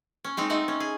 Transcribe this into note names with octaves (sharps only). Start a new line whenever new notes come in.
C#4
G#3 C4 D#4
A3 D#4 F#5
C#4
G#4